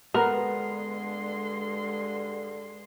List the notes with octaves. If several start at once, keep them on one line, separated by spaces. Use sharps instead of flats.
G2 D3 G#3 B3 A#4 C6